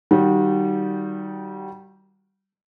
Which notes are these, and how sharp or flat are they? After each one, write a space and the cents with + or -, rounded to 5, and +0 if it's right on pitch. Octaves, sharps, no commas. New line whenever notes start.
D#3 +0 G3 -20 F#4 -30